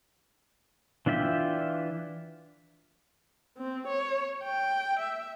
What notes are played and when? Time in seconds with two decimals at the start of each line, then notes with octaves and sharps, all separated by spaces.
1.06 E3 D4 F4 E5 G5
3.58 C4
3.87 C#5
4.43 G5
5.00 E5